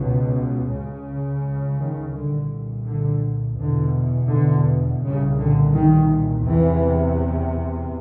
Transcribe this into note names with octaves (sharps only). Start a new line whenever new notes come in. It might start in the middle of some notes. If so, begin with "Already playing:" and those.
Already playing: C#2 B2
C#2 C#3
D#3
C2 A#2 D3
D3
E2 B2 D3
D3
C2 A#2 C#3
D3
D#3
E2 C3 E3